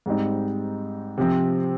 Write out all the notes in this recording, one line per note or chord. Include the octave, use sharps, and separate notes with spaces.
G#2 G3 C4 D#4
C3 F3 C4